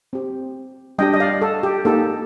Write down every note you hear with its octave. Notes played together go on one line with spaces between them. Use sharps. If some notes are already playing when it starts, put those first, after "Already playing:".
C4 G4
G3 D4 G4 D#5 G5
D#5
D5 F5
A4
G4
A#3 D#4 G4 A4